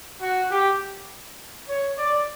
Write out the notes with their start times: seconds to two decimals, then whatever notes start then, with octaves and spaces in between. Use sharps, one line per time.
0.21 F#4
0.50 G4
1.69 C#5
1.98 D5